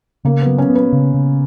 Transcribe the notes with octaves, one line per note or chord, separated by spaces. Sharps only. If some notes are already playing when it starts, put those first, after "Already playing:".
C#3 A#3
F#3 B3
C#4
B3
B4
C#3
C#3